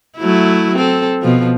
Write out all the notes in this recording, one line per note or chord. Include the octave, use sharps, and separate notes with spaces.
F#3 A3 E4
C4 A4
B2 F3